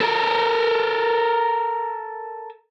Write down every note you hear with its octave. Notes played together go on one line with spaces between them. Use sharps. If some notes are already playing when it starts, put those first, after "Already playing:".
A4 A#4